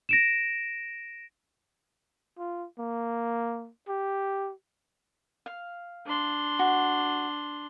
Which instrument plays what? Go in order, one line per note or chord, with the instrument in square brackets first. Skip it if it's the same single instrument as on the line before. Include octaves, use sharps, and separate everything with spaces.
[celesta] A#6 D7 E7
[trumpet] F4
A#3
G4
[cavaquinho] F5
[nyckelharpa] D4 C6
[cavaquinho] F#4